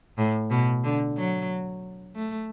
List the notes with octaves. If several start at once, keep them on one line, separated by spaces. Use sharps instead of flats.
A2
B2
D3
F#3
A3